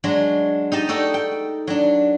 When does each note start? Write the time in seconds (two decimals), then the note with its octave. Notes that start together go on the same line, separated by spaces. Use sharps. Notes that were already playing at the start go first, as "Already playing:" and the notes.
0.04 F#3 G#3 D4
0.72 D#4 G4 D#5 A5
0.89 D#4 F#4 A4 D5
1.14 G5
1.67 F#3 D4